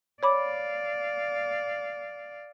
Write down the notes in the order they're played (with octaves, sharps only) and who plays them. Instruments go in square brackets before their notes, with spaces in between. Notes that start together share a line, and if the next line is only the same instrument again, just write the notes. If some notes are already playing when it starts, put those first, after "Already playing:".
[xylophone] C#5 B5 D6 [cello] D5 F5